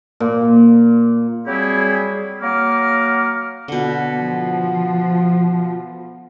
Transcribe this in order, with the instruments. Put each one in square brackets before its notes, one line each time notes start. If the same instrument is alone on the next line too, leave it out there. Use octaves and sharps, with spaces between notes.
[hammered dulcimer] A#2
[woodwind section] F#3 G3 C4 E4 G4 G#4
F#3 A#3 F#5 A#5 D6 F6
[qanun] B2 D3
[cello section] F3